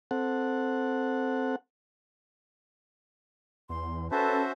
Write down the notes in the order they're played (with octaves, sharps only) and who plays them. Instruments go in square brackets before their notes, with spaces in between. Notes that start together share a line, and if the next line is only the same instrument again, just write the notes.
[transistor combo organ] C4 A4 F#5
[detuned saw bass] E2 [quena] C6
[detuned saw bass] C#4 [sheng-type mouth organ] F#4 C5 E5 [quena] A4 [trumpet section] B4 A5